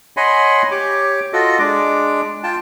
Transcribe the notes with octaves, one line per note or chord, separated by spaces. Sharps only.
C#5 D#5 F#5 G#5 B5 C6
G4 C#5 D6
F4 F#4 A4 D#5
G#3 D4 D6
F4 G5 A5